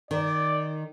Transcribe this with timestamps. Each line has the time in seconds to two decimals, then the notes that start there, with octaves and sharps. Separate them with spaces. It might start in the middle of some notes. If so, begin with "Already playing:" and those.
0.11 D#3 D5